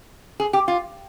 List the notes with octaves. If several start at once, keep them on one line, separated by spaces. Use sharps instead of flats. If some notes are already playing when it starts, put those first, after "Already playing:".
G#4
G4
F4